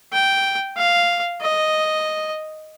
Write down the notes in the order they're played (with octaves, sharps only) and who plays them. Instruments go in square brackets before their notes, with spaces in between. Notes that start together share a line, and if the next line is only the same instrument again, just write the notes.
[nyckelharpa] G5
F5
D#5